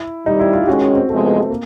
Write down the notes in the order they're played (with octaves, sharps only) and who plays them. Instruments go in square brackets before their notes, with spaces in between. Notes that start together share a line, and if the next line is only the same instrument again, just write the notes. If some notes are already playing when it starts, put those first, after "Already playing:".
Already playing: [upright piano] E4
[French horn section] C3 D#3 G3 [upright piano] D#4
[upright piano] E4
F4
G4
[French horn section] D#3 G#3 C#4 [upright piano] F#4
[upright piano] F#4
C4
[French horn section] E2 C3 F3 G#3 B3 [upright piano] A3
[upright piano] A#3